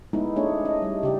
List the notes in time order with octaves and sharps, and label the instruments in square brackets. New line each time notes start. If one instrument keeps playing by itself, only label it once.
[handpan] G#3 A3 B3 D#4 E4
A3 B3 C#4 D4 G#4 C#5
C#4 D#5
G3
C#3 G4 D5